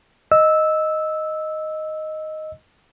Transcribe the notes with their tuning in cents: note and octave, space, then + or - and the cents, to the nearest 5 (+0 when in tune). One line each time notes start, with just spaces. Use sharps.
D#5 +0 E6 -10